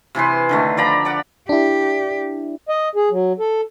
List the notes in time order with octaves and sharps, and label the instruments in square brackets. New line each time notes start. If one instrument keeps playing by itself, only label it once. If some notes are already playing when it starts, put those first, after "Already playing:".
[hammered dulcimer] C3 E3 B4 C6
D3 D#3 A3
F3 D5 A#5 B5
D5 F#5
[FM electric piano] D4 E4 [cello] G4
[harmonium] D#5
G#4
F#3
A4